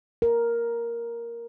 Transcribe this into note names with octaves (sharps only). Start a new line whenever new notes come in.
A#4